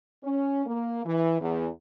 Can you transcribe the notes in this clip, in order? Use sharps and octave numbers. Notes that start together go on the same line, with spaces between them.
C#4
A#3
E3
E2